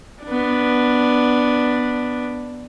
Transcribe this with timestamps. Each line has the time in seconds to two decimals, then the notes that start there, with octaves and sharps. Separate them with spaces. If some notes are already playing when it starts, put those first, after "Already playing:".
0.25 B3 D4